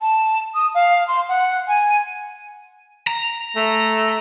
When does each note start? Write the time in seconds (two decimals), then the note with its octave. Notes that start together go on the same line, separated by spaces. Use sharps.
0.01 A5
0.54 D#6
0.75 F5
1.08 C6
1.29 F#5
1.68 G#5
3.07 A#5
3.56 A3